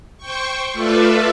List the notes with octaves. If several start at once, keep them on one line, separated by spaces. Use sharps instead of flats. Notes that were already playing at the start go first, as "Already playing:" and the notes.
C5 G5 C#6
A3 F4 A4 B4 D5 E5